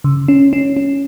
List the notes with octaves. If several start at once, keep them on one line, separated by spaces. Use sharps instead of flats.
C#3
C#4
C#4
C#4